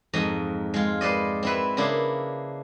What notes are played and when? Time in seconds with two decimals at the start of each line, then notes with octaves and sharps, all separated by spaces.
0.13 F2 G#2 D#5 A#5
0.74 G#3 F4
1.01 B4 C5 D5 D#5
1.43 C4 E4 B4
1.77 C#3 A#3 D4 E4